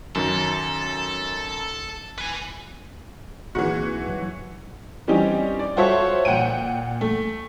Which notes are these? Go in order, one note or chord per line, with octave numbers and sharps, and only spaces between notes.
F#2 D#3 F#3 A4
B4 G#5
B1 E3 F#3 A#3 C4 D#4 F#4 G#4
G2 F#3
E3 G3 C4 C#4 D#4 G4
D5
F4 F#4 A4 C5 C#5 E5
A#2 F#5 G5 D7 D#7
A3